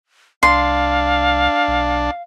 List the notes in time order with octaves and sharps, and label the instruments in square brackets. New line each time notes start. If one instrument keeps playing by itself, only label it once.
[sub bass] C2 [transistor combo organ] D4 [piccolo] F5 [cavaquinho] C6
[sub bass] B1